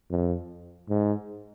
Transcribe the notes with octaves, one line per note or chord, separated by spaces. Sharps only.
F2
G#2